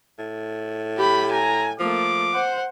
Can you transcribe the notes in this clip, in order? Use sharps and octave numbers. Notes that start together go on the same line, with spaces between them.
A2
G4 B5
G#5 A#5
F3 A3 A#3 D6
C5 F#5